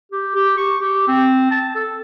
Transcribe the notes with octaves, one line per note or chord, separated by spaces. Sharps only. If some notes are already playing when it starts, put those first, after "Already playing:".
G4
G4
C#6
G4
C4
A5
A4